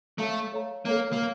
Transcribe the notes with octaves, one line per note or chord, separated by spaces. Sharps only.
A3 A4 C#5 F5 A#5
A4 C#5 F5 A#5
A#3 A4 C#5 F5 A#5
A#3